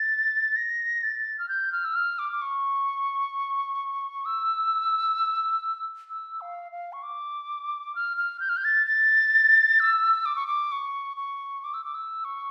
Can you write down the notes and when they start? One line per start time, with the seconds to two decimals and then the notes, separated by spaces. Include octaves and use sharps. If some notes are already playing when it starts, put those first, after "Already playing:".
Already playing: A6
0.56 A#6
1.03 A6
1.39 F6
1.49 G6
1.72 F6
1.85 E6
1.96 F6
2.19 D6
2.32 D6
2.42 C#6
4.25 E6
6.10 E6
6.41 F5
6.72 F5
6.93 C#6
7.03 D6
7.95 F6
8.17 F6
8.40 G6
8.49 F6
8.57 G6
8.64 A6
8.86 A6
9.80 E6
10.26 D6
10.36 C#6
10.47 D6
10.72 C#6
11.17 C#6
11.64 D6
11.74 E6
11.84 D6
11.94 E6
12.25 C#6